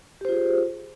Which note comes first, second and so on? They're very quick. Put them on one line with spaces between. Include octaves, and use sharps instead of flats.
G4 C5 F4 G#4